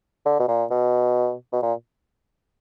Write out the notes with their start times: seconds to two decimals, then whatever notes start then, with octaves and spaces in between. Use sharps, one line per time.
0.26 D3
0.40 B2
0.48 A#2
0.70 B2
1.53 B2
1.62 A#2